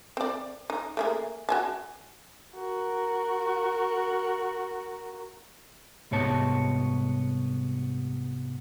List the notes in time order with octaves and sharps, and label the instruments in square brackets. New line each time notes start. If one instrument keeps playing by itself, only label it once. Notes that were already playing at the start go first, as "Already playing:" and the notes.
[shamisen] C4 D5
D#4
A3 A#3 G#4
F#4 G#5 A5
[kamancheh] F#4 A#4
[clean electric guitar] C2 G#2 B3 C#5 A5